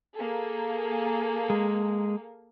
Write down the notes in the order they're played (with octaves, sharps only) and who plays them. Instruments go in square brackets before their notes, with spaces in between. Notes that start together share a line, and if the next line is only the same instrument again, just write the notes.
[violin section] A#3 G#4 A4
[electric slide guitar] G#3